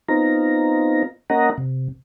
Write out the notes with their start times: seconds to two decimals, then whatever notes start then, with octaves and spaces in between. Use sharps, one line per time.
0.09 B3 C4 D#4 F4 A#5
1.30 A#3 C#4 D#5 F#5 A#5
1.58 C3